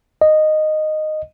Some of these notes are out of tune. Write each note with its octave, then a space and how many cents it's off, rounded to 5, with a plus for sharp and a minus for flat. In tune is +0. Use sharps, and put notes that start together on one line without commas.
D#5 -10